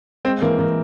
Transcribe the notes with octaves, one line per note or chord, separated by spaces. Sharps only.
G#3 C4
E3 A#3
E3 A#3